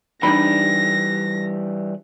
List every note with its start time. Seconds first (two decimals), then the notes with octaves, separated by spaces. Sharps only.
0.23 E3 G3 D4 D#4 B5 A#6